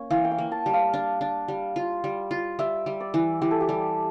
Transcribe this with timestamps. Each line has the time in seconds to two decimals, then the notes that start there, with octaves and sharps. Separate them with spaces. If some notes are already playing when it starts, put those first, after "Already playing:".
Already playing: A#3 C#4 C#5
0.11 E3 F5
0.25 G5
0.31 F5
0.38 A#3
0.52 A5
0.66 G3
0.73 F5
0.94 D4
1.21 D4
1.48 G3
1.76 F4
2.04 G3
2.31 F4
2.59 G3 E5
2.86 G3
3.00 D5
3.14 E3
3.41 E3 G4
3.51 A4
3.61 G4
3.69 G3